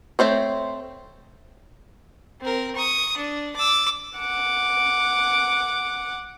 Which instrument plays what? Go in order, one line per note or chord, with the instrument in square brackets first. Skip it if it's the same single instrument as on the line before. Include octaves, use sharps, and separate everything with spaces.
[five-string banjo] A3 C4 C5 C#5
[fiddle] C4 A#4
C#6 D#6
D4
D6 E6
[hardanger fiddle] F#5 D6